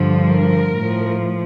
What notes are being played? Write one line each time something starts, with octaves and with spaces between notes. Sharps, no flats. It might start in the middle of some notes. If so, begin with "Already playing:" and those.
Already playing: G2 D3 F3
A#4
A2 F3